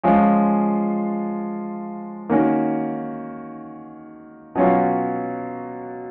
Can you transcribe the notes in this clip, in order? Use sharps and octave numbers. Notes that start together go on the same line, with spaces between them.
F3 G#3 C#4 F4
D#3 A#3 C#4 F#4
B2 F#3 C#4 F4